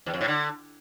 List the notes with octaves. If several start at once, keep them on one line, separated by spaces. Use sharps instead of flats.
E2
F2
A2
D3